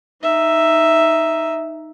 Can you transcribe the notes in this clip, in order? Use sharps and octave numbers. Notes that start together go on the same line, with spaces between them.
D#4 E5